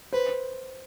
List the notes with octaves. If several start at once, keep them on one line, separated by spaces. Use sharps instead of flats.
B4 C5